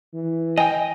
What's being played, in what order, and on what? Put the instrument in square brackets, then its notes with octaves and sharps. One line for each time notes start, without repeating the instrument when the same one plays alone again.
[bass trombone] E3
[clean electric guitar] D#5 G5 [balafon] G#5